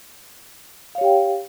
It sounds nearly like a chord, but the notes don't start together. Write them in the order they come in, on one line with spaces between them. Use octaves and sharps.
F5 C#5 G4 G5